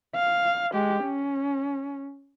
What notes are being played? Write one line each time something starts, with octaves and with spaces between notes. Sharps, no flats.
F5
G#3 G4
C#4